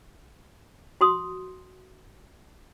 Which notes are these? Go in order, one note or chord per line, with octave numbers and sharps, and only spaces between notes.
F#4 C6 D#6